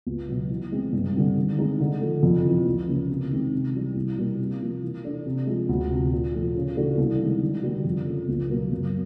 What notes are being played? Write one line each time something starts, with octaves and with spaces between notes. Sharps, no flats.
C#2
B2 F#3
E3
G#3 C4
G2
D3 G3 C4
D#3
G#3 C4 D#4
D3
F3 A3
F2
C3 E3
C#2
C#3 F3 A#3 C#4
C3
D#3 G#3 C4
C3
E3 G3
C2
B2 G3 A#3
C3
F3 A#3
E3
A3 D4
C3
F3 G#3
D2
C3 F3
A#2
F3 A3
C#3
E3 A3 D4 F#4
C2
C3 D#3 G#3
D3
G3 A#3 D4 F#4
F2
C#3 F3 A3
C#2
B2 F#3 A#3
F#2